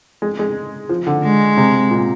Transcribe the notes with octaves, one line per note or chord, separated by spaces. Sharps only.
G#3
G#3
F3
D3
G#3
C3
A#2